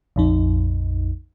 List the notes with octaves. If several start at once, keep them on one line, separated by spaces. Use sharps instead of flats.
A#1 F2 D#4